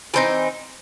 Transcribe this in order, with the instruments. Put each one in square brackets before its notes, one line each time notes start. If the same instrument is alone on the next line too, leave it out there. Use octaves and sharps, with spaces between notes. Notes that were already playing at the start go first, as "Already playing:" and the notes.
[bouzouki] E3 A3 C4 D#4